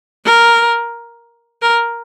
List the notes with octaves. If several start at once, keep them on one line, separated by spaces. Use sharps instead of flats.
A#4
A#4